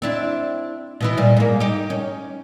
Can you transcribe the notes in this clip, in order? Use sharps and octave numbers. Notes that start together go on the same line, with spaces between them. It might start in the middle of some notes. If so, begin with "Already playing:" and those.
C4 D4 E4
B2 E3 E4
A#2 G3
G#2 A#3
D#4 G4
C#4